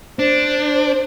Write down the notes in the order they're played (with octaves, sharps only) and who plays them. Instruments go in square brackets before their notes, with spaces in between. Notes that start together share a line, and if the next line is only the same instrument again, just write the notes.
[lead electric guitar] D4 [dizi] C5